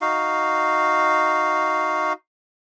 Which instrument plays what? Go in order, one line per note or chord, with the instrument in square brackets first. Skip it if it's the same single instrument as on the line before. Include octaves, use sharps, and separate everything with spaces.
[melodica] D#4 F#4 F5